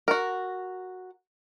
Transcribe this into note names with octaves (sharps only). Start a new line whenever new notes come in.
F#4 A#4